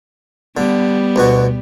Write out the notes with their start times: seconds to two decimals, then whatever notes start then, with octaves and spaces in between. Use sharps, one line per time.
0.57 D3 G3 B3
1.16 D2 B2 F#4